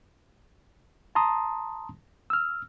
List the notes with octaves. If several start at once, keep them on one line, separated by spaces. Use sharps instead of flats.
A5 A#5 C6 D#6
E6 F6